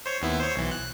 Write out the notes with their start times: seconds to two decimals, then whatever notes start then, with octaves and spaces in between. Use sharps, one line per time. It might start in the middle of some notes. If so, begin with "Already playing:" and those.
0.06 C5 C#5
0.22 D#2 B3 E4
0.40 C5 C#5
0.56 B1 E3
0.71 F#6